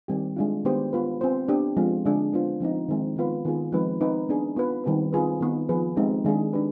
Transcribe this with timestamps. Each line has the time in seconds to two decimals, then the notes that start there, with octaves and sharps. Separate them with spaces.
0.08 D#3 G3 C4 G4
0.36 G#3 D4 F4
0.65 D#3 B3 D4 G4 C5
0.93 B3 F4 B4
1.21 C4 F4 C5
1.48 B3 D4 G4
1.77 F3 G#3 C4 F4
2.05 D3 G#3 D4 G#4
2.33 B3 D4 F4 C5
2.60 F3 C4 D#4
2.89 D#3 G#3 C4
3.16 D#3 B3 F4 B4
3.45 D#3 B3 F4 G#4
3.72 F3 G#3 C4 D#4 B4
4.01 C4 D#4 B4
4.29 B3 D4 G#4
4.56 B3 F4 B4
4.84 D#3 G3 C4 G4 B4
5.13 C4 F4 G#4 B4
5.41 D#3 B3 D#4
5.69 F3 B3 F4 G#4 B4
5.96 G#3 C4 D#4 G4
6.25 D#3 G#3 D4 G#4
6.53 D4 G4 B4